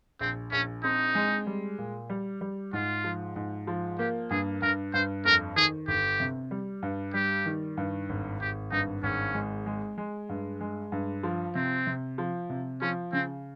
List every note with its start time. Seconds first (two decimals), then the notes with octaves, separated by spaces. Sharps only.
0.20 A#1 C4
0.52 A#1 C#4
0.83 C4 D#4
1.15 G#3
1.47 G3
1.78 A#2
2.10 G3
2.41 G3
2.73 G#2 F4
3.04 F3
3.36 G#2
3.67 F3
3.98 A#3 G4
4.30 G2 G#4
4.62 G2 A#4
4.93 G2 C5
5.25 F2 A#4
5.56 D#3 G#4
5.88 G1 G4
6.20 C3
6.51 G3
6.83 G2
7.14 G3 G4
7.46 D#3
7.77 G2
8.09 G#1
8.40 G#1 G4
8.72 G2 D#4
9.03 G#1 C#4
9.34 G#3
9.66 G#3
9.98 G#3
10.29 G2
10.61 G#3
10.92 G2
11.23 F3
11.55 C3 C4
11.87 C3
12.18 F3
12.50 C3
12.81 F3 C#4
13.12 C#3 C4